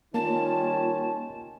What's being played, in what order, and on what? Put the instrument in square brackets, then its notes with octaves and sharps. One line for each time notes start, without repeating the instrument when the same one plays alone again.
[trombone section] D#3 G3 C#4 [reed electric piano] A#3 [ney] F4 [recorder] A5